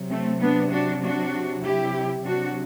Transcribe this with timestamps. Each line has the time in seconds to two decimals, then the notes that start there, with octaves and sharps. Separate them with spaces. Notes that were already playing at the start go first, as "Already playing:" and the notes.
Already playing: C3 F#3
0.09 A3 C4
0.40 B3 D4
0.71 D4 F#4
1.02 D4 F#4
1.63 E4 G4
2.25 C3 F#3 D4 F#4